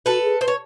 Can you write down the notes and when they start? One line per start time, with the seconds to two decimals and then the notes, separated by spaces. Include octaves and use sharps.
0.06 F#4 A4 B4
0.23 G#4
0.41 B4 C5
0.48 C#5